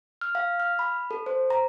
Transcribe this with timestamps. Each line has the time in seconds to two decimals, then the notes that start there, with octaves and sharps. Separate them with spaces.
0.21 F6
0.35 F5
0.60 F6
0.79 B5
1.11 A4
1.26 C5
1.50 A#5